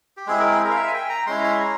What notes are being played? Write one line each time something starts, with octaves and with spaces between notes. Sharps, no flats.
G4
G#3 C4 E4 G#4
A#4
G#4
A#4
F5
E5
G#5
G5
A#5
G#3 C#4 E4 C6
C6
A#5